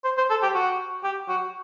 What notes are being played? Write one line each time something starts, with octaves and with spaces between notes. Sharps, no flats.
C5
C5
A4
G4
F#4
G4
F#4